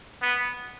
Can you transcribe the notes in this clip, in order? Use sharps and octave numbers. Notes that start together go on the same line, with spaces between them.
B3